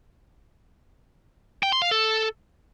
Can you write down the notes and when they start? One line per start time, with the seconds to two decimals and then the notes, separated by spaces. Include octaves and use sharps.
1.63 G5
1.72 C6
1.82 F5
1.91 A4